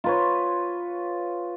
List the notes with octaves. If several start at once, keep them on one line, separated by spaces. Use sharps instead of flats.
F4 B4 C#5